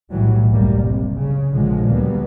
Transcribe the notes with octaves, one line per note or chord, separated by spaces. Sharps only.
B1 A2 E3 F#3 G3
F#1 C#2 A2 G3 A#3
C3
C#3
A#1 A#2 D3 F3 G#3
D2 F#3 G3 A#3 B3